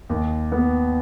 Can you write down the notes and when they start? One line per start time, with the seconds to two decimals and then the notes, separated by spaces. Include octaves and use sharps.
0.09 D#2
0.52 B3